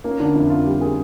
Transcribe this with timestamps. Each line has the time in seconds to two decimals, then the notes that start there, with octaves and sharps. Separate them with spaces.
0.04 A#3 C#4
0.20 D3 D4
0.35 F2 E4
0.50 A#3 F4
0.66 G3 G4
0.81 A#3 G#4